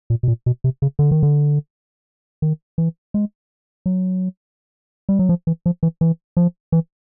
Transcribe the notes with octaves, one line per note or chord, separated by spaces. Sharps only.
A#2
B2
A#2
B2
C3
C#3
D3
D#3
D3
D#3
E3
G#3
F#3
G3
F#3
F3
E3
F3
E3
E3
F3
E3